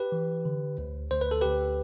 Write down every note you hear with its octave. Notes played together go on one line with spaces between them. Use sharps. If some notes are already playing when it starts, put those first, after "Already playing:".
Already playing: G4 B4
E3
D3
D2
D2 C5
B4
A4
D2 G4 B4